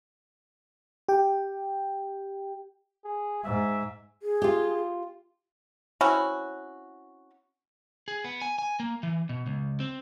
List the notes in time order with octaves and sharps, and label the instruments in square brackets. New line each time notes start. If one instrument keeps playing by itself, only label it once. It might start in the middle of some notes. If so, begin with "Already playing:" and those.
[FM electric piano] G4 G5
[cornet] G#4
[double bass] G#2 [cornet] E5
[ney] G#4
[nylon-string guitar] F4 G4
[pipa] C4 C#4 E4 F#4
[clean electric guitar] G#4
B3
G#5
G#5
A#3
E3
B2
C#2
C4